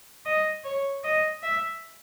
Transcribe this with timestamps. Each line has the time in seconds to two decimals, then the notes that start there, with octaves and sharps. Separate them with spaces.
0.26 D#5
0.65 C#5
1.04 D#5
1.43 E5